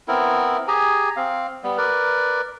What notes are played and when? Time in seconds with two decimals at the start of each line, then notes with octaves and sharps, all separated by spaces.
0.08 B3 C4 E4 A#4
0.68 G4 G#4 G#5 A#5
1.16 C4 F5
1.63 G3 B3
1.78 A#4 B4 D5